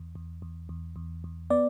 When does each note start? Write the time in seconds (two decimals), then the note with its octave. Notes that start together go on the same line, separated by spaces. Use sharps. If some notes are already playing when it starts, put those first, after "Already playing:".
Already playing: E2
0.15 E2
0.42 E2
0.69 E2
0.96 E2
1.24 E2
1.50 B3 D5